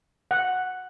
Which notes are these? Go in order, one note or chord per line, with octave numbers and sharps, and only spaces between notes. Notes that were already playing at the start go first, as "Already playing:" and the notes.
F#5